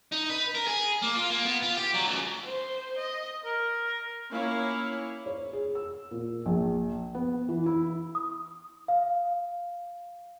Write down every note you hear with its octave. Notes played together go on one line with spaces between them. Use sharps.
D#4
B4
A#4
G#4
A#3
F4
A#3
B3
F4
G4
F#3
C#2
C5
D#5
A#4
A#3 C#4 E4 C#5 F5
C#5
G#4
E6
A#2
A#1
B3
E3
E4
D#6
F5